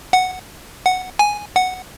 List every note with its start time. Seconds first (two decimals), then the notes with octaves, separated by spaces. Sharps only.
0.13 F#5
0.85 F#5
1.19 G#5
1.56 F#5